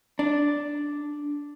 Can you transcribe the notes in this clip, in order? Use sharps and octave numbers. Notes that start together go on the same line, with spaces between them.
D4